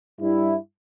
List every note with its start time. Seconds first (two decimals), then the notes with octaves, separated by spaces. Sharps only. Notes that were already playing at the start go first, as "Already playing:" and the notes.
0.20 G2 G3 E4